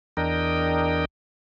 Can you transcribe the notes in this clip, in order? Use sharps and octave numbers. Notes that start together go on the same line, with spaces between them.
E2 D4 A#4 D#5 G5